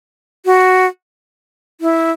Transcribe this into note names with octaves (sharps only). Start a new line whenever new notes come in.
F#4
E4